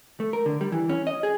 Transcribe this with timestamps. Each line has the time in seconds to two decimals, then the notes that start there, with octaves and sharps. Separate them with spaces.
0.20 A3
0.33 A#4
0.46 D3
0.61 G3
0.72 E3
0.89 C#4
1.07 D#5
1.23 G#4